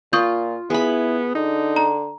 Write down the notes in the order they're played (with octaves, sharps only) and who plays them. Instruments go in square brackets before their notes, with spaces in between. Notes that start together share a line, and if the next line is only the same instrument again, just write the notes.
[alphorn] A#2 [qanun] F4 [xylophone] C#6 D#6 G6
[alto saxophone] B3 [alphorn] E4 [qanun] G#4 B5
[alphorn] D3 [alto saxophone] D#4
[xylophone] A#5